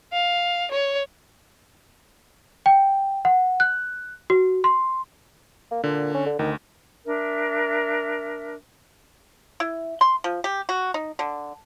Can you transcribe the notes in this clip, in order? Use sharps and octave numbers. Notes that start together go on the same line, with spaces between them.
F5
C#5
G5
F#5
F#6
F#4
C6
A#3
A#2 D3
C#4
D3
D2 D#3
D4 A#4 E5
E4
C6
F3
G4
F#4
D#4
D3